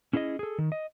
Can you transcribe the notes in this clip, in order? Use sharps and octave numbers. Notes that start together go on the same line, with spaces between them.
C#4 E4 G#4 D5 D#5
G#4 A4
D#3
D#5